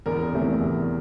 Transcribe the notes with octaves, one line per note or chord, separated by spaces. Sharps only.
E2 A#4
C3 E3 A3
E2